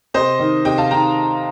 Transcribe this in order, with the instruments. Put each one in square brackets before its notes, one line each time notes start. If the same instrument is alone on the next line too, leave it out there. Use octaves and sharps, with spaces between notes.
[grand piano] C3 C5 D#5
D#3
C3 D#5 G5
F5 A5
D#3 G5 A#5